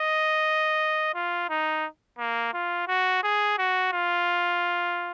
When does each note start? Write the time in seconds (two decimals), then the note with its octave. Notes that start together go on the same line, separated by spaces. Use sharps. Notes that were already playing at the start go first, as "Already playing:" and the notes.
Already playing: D#5
1.14 F4
1.50 D#4
2.18 A#3
2.54 F4
2.88 F#4
3.23 G#4
3.58 F#4
3.93 F4